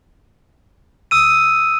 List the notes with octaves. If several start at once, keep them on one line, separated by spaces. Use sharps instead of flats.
D#6 E6 D#7